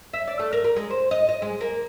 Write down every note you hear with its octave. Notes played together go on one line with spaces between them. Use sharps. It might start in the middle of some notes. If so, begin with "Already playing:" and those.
E5
D5
A3
A#4
A#4
G#3
C5
D#5
D#5
G#3
A#3